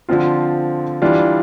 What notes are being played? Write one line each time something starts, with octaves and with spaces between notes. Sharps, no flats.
D3 F3 C4 F4
E3 G3 D4 F4